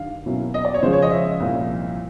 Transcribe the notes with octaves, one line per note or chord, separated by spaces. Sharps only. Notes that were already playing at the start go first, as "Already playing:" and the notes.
Already playing: G2 D#3 G3 F5
B2 F#3 A#3 C#4 E4
D#5
D5
C#5
C#3 F3 G#3 C5
C#5
D#5
E5
C2 A#2 F3 A#3